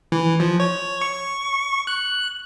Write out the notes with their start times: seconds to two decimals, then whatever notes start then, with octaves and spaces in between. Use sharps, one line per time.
0.12 E3
0.40 F3
0.60 C#5
1.02 C#6
1.87 F#6